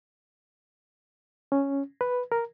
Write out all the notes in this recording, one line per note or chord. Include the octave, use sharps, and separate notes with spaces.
C#4
B4
A#4